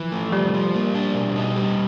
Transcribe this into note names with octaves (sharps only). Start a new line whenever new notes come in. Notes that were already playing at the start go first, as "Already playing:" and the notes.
Already playing: E3 F3
A3
F3 G3
F3
A#3
D4
B2
D#4
G3